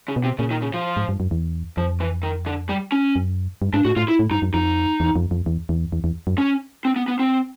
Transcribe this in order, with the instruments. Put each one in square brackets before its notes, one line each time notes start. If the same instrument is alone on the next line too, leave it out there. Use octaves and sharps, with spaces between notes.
[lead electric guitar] C#3
[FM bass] B2
[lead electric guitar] C3
[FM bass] A#2 [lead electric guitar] C#3
[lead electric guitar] D#3
C#3
F3
[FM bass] G#2
G2
F#2
E2
[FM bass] F2 [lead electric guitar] F3
[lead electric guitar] E3
D#3
D3
G3
C#4
[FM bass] F#2
G2
[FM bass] G#2 [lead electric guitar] D4
[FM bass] A2 [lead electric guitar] F#4
[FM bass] A2 [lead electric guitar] F4
[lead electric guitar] E4
[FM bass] A2
[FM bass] G2 [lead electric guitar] D#4
[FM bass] F#2
[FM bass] F2 [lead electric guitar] D#4
[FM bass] E2
F2
F2
E2
E2
E2
E2
F#2
[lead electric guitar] C#4
C4
B3
B3
C4